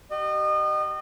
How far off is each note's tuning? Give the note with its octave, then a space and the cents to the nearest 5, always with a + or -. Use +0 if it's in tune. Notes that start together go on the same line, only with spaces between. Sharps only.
G4 -40 D#5 -30